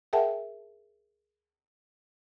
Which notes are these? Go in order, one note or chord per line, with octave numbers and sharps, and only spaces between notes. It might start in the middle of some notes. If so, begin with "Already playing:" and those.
G#4 A#4 E5 F#5 G5 A5